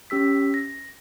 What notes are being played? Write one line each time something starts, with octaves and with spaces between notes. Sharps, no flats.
C#4 G4 E6 B6
A#6